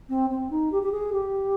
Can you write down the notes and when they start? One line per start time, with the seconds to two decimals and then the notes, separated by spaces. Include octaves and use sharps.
0.09 C4
0.30 C4
0.50 D#4
0.71 G4
0.82 G4
0.91 G#4
1.12 G4